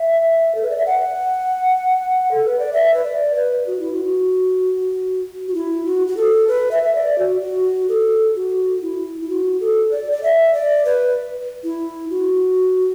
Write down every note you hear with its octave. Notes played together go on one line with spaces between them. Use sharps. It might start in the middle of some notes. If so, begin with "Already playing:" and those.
Already playing: E5
A4
B4
D5
E5
F#5
A4
B4
D5
E5
B4
D5
B4
F#4
E4
F#4
F#4
E4
F#4
F#4
A4
B4
E5
E5
D5
F#4
F#4
A4
F#4
E4
E4
F#4
A4
D5
D5
E5
D5
B4
E4
F#4